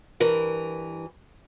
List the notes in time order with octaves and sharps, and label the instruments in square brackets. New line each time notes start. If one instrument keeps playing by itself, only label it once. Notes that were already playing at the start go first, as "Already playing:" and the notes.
[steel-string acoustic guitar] G2 E3 A#4